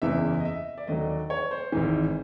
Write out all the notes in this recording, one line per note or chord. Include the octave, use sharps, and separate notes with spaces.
F#1 E2 C#3 E3 E5
D#5
E5
D5
D#2 D3 F#3 D#5
D5
C#5
C5
G#1 G#2 E3